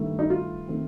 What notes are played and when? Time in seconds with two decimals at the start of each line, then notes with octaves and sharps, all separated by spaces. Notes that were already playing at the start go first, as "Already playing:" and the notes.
Already playing: G2 D#3 A3
0.19 D#4
0.30 F4
0.68 D#3 A3 C4